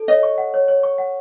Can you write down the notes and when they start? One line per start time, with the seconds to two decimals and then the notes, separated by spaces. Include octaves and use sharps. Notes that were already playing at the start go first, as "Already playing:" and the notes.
Already playing: A4
0.08 C#5 D#5
0.23 C#6
0.38 F#5
0.54 C#5
0.68 C#5
0.83 C#6
0.98 F#5